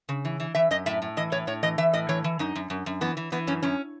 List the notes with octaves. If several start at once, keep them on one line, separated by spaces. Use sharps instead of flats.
C#3
E3
E3
E3 E5
F#2 D#5
A2 E5
A2
E3 D#5
A2 C#5
A2 C#5
E3 D#5
E3 E5
A2 D#5
E3 C#5
E3
F#2 D#4
F#2
F#2
F#2
E3 B3
E3
E3 B3
F#2 C#4
F#2 C#4